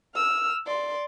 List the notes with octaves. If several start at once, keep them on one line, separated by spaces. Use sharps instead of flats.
E6 F6
D5 C6